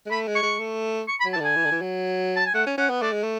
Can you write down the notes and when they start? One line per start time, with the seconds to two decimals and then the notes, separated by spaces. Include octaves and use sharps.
0.06 G#3
0.11 A3 B5
0.27 G#3
0.35 C#6
0.43 G#3
0.59 A3
1.08 C#6
1.20 B5
1.25 F#3
1.33 A5
1.36 E3
1.40 D3 G#5
1.56 E3
1.65 D3
1.72 E3
1.81 F#3
2.36 A5
2.45 G#5
2.54 A3 F#5
2.66 C#4
2.78 C#4 F#5
2.90 B3
3.02 A3 D5
3.12 G#3
3.23 A3